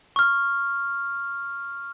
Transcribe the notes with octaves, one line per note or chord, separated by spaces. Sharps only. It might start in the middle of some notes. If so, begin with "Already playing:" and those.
C#6 F6